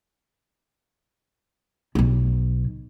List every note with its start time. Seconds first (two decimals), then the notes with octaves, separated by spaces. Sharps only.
1.95 B1 B2